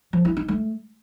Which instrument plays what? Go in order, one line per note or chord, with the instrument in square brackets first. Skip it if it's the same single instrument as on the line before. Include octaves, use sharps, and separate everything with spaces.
[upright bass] F3
E4
D#4
A3